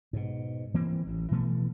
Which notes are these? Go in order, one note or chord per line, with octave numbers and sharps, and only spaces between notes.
G#2 B2
E3 A#3 C4
A1
B2 E3 A3 B3